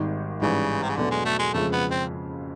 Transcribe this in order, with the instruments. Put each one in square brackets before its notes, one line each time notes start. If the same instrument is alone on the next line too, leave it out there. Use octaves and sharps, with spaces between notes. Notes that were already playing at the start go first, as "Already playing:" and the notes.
Already playing: [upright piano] G#1 G#2 D#3 G3
[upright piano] A1 G#2 E3 G3 [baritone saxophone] C#3
[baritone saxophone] C3
C#3
[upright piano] E2 B2 F#3 A3 D4 [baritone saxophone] D3
[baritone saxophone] G#3
A3
G#3
[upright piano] F#1 F2 C#3 F3 G#3 [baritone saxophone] A3
[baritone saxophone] B3
C4